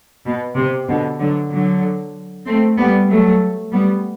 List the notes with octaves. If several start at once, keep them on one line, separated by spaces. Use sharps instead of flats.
B2
C3
B2 D3
D3 F#3
D3 F#3
A3 C4
G3 B3
F#3 A3
G3 B3